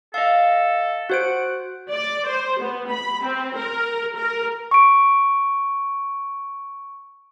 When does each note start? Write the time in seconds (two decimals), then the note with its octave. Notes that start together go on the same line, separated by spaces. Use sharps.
0.14 A4 D#5 F5
1.10 F#4 C5 F#5 D7
1.90 D5
2.29 C5
2.61 B3
2.91 B5
3.24 C4
3.55 A#4
4.16 A#4
4.71 C#6 D7